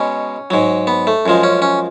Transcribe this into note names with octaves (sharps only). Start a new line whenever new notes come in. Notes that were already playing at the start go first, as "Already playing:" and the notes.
Already playing: B2 G#3 C#4
G#2 F#3
B3
A3
F#2 F3 G#3
C#4
C#4